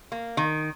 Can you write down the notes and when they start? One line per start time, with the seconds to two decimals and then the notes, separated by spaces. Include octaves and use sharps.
0.12 A#3
0.37 D#3